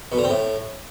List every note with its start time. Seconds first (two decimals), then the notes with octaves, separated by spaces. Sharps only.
0.12 B2
0.18 D3
0.24 C4
0.30 A2